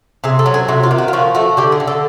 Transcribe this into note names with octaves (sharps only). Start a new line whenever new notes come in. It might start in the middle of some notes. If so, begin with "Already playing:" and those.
C3 G#4
A4
F#3
G#4
C3 F#4
F4
D#3
F#4
F4
F3 F#4
A3 F#4
D3 G4
G#4
D3
A4